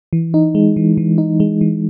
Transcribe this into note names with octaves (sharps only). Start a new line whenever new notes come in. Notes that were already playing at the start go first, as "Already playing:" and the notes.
E3
D#4
G#3
E3
E3
D#4
G#3
E3